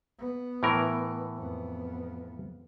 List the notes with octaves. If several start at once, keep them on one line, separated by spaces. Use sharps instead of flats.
B3
A2 E3 A#4
F2 B3